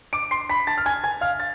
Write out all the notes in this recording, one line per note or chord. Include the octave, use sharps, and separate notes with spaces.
D6 D7
C6 C7
B5 B6
A5 A6
F6
G#5 G#6
G#5 G#6
F5 F6
A6